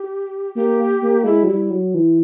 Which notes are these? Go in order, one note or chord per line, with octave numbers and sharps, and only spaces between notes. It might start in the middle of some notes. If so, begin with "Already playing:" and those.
Already playing: G4
A#3 G4
A#3
G#3 E4
F#3
G3 E4
F#3
E3